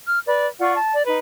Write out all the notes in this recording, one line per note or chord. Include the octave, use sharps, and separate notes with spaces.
F6
B4 D5
F4 D5 F#5 C#6
A5
D5
D#4 B4